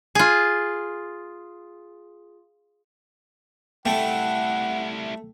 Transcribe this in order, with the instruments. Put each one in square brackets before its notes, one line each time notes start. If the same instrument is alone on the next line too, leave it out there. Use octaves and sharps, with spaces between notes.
[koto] F4 G#4
[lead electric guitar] G3 E4 [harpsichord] A3 [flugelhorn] F#5 [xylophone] G5